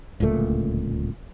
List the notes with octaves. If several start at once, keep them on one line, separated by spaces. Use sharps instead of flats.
D1 C#2 A#2 A3